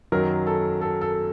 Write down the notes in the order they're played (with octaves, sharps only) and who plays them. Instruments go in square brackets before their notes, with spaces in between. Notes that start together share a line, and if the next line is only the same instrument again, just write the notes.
[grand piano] F#2 D#3 F#3 A#4
A4
A4
A4